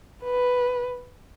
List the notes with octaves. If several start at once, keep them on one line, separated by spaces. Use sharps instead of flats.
B4